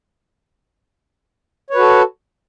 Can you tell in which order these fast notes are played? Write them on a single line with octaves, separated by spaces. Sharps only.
C#5 B4 F#4 A4